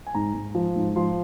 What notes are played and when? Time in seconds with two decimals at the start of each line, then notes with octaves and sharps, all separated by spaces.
0.07 G#5
0.15 G#2 A#5
0.34 G#2
0.55 F3
0.76 G#2
0.96 F3 C6